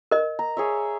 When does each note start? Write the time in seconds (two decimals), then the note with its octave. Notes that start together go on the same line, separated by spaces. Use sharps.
0.11 A#4 D#5
0.39 A#5
0.57 G#4 C#5 E5